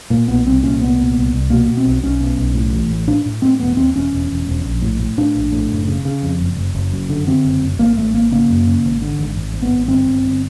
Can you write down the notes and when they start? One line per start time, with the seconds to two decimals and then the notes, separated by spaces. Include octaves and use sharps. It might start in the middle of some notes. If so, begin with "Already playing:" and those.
0.10 A#2 A#3
0.28 B1 B3
0.46 C2 C4
0.63 A#2 C#4
0.80 C2 B3
0.98 A#2
1.16 C2
1.33 C2
1.50 B2 A#3
1.68 B2
1.77 C4
1.86 B1
2.03 B1 C#4
2.20 B2
2.38 B1
2.55 A2
2.73 A1
2.90 A2
3.07 A2 D4
3.26 A2
3.42 A2 C4
3.59 E1 B3
3.77 D#2 C4
3.95 E1 C#4
4.12 E1
4.30 E1
4.47 E1
4.65 A#1
4.82 A2
5.00 A2
5.17 A2 D4
5.35 A#1
5.52 A2
5.70 F#1
5.88 C#3
6.05 C#3
6.22 F2
6.40 F#1
6.57 F#1
6.75 F#1
6.92 F#2
7.09 D3
7.27 D3 C4
7.45 F#1
7.61 F#1
7.79 G#1 A#3
7.97 G#1 A3
8.14 G#1 A#3
8.32 C#3 A#3
8.49 F#2
8.67 C#3
8.84 G#1
9.02 D3
9.19 G#1
9.37 G#1
9.54 G#1
9.62 B3
9.72 G#1
9.88 G1 C4
10.07 G1
10.23 G1